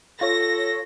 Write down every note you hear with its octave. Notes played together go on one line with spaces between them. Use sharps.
F4 A4 C#5 A#6